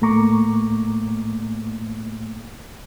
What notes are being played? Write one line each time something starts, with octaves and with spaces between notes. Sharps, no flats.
A2 A3 A#3 A#5 C#6 D6